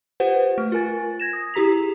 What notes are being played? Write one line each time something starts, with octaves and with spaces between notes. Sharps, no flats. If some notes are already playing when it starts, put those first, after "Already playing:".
F4 G4 B4 C5 F#5
A3
F4 A#4 G#5 A6
G#6 A#6 E7
D#6 A#6
E4 G4 G#4 A#5 B6 F7